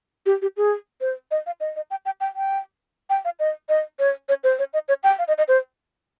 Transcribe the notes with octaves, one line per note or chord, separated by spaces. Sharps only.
G4
G4
G#4
C5
D#5
F5
D#5
D#5
G5
G5
G5
G5
G5
F5
D#5
D#5
C#5
C#5
C5
C#5
D#5
C#5
G5
F5
D#5
D#5
C5